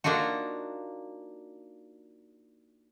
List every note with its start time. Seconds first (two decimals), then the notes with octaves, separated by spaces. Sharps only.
0.04 A#3 D4 D#4 F4 F#4